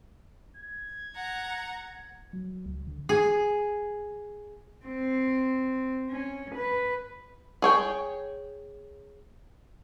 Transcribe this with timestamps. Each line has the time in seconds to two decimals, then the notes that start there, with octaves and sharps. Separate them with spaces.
0.57 G#6
1.15 F#5 A#5
2.33 F#3
2.66 C#2
2.87 D3
3.09 G#4
4.86 C4
6.10 C#4
6.55 B4
7.62 G#4 C#5 G5